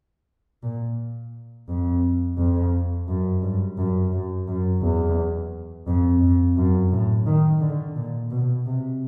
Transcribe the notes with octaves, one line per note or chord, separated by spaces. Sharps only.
A#2
F2
F2
F#2
G2
F#2
F#2
F#2
E2
F2
F2
F#2
A2
D#3
D3
A#2
B2
C3